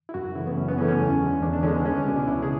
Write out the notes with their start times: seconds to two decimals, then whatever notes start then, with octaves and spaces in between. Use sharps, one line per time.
0.09 E4
0.14 F#2 F#4
0.35 C#3 E3 A3 E4
0.47 B3
0.57 F#2 C#4
0.68 B3
0.78 C#3 E3 A3 C#4
0.89 C#4
1.00 E2
1.21 D3 G#3
1.42 E2 D4
1.53 D4
1.63 D3 G#3 C#4
1.74 B3
1.85 C#2 C#4
1.95 D4
2.06 B2 G#3 E4
2.16 D4
2.27 C#2 E4
2.42 G#4